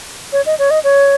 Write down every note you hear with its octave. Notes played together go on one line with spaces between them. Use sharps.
C#5
D#5
C#5
D#5
C#5